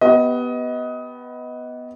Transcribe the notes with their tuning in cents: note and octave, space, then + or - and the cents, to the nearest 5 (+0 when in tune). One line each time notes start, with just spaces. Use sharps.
B3 +0 G4 -20 D#5 +20